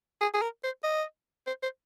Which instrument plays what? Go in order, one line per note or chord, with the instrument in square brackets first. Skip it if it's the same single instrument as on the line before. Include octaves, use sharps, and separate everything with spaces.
[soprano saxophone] G#4
G#4
A#4
C5
D#5
C5
C5